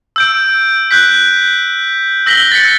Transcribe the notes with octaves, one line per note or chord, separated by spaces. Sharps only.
E6 G6 D7
F#6 G6 B6
E6 A#6 B6 F#7 G7
A6 B6 C#7